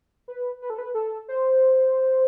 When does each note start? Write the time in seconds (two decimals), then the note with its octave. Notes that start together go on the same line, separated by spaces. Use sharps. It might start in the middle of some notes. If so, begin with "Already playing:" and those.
0.28 B4
0.62 B4
0.70 A4
0.78 B4
0.95 A4
1.29 C5